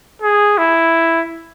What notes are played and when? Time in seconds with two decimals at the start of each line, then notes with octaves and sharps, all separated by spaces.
0.22 G#4
0.58 E4